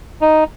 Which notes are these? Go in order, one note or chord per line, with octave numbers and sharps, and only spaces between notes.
D#4